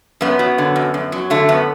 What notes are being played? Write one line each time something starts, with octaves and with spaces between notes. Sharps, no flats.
F#2 B3
F#3
D3
F#2
F#2
F#3
D3 A3
F#2 B3